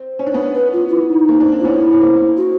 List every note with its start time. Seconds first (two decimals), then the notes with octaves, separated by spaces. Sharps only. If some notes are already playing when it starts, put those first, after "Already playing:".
Already playing: C4
0.19 C#4
0.26 D4
0.34 B3 C#4
0.55 B4
0.73 F4
0.88 F4
0.91 E4
1.09 D#4
1.28 A#3 C4
1.40 C4 D4
1.52 C4 D4
1.61 F4
1.65 B3 C#4 E4
1.92 C#4
2.01 A#3 C4
2.37 F#4